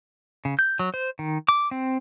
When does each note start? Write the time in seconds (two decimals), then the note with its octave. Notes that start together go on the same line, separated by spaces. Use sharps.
0.45 C#3
0.59 G6
0.79 F#3
0.94 C5
1.19 D#3
1.49 D6
1.71 C4